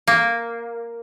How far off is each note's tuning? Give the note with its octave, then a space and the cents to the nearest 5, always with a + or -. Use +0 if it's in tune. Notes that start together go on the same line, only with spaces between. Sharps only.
A#3 -5